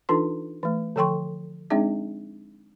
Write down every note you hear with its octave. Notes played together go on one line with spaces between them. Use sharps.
E3 D4 D#4 F4 A4 C6
E3 A3
D3 F3 A4 G5 C6 C#6
G#3 C4 D4 D#4 G#4 E5